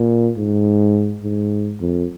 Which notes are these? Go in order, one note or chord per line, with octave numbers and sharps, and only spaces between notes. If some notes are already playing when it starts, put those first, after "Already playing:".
Already playing: A#2
G#2
G#2
F2